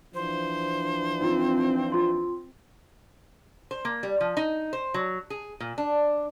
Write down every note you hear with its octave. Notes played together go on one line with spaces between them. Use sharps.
E3 F3 D4 C5
C4 D#4 F4
F4 C6
C5
A#3
G3
F3
D#4
C5
F#3
G#4
A#2
D4